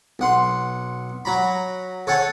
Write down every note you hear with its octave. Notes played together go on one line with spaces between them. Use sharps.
B1 F#5 C6
F#3 A#5 B5
A4 C#5 F#5 G#5 A5